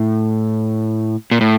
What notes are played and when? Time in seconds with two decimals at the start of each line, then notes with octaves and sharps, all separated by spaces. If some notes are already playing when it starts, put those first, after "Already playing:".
Already playing: A2
1.31 A#2
1.41 A2